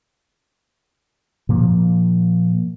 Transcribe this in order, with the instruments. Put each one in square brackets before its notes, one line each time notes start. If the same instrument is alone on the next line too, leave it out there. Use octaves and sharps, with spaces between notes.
[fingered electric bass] A#2 F3 A#3